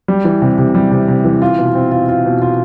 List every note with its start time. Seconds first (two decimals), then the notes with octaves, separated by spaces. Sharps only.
0.08 G3
0.25 E3
0.42 C3
0.58 C3
0.75 G3
0.91 C3
1.08 C3
1.25 E3
1.42 F4
1.58 B2
1.75 C4
1.92 F4
2.09 F4
2.25 B2
2.42 F4